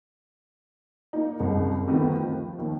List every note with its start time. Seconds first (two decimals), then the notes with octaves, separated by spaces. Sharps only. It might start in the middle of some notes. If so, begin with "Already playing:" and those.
1.13 A#3 D#4
1.40 F#1 C2 G#3
1.87 D2 C3 D#3 F3 A3 B3
2.21 F3
2.59 D#2 D#3